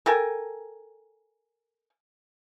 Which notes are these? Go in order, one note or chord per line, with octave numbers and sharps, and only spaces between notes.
A4 A#4 G5 G#5